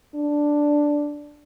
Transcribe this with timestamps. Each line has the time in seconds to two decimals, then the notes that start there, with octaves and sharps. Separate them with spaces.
0.15 D4